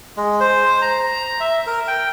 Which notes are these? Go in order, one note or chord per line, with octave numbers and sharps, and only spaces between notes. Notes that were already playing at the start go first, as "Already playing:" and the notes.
G#3
C5
A#5
E5
A#4
G5